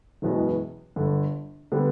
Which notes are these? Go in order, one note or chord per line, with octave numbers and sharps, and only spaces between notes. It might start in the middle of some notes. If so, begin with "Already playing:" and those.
F#1 E2 B2 G#3 B3
G1 G2 D3
D3 G3 B3